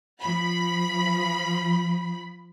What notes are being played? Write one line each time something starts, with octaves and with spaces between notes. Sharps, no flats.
F3 B5